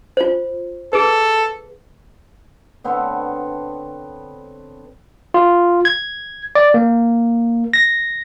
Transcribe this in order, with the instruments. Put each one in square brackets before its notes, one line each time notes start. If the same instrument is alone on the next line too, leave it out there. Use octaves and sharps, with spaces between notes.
[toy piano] F4 C5
[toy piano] G#4 B4 [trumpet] A4
[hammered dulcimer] D3 B3 C4 C#5
[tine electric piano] F4
G#6
D5
A#3
A#6